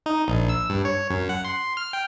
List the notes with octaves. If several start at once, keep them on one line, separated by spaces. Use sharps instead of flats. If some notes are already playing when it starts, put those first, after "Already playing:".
D#4
A#1
E6
G2
C#5
F#2
F#5
C6
F6
G5